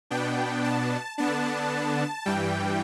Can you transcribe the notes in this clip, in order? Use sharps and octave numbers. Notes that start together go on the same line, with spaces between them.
B2 B3 D4 G5
A5
D3 B3 D4 A5
G2 E3 G3 G5